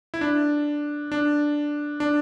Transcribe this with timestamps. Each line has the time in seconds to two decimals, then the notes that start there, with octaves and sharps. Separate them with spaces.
0.14 E4
0.21 D4
1.12 D4
2.00 D4